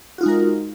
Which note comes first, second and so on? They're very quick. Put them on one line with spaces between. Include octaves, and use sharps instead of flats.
F#4 F4 D#4 G#3 A#4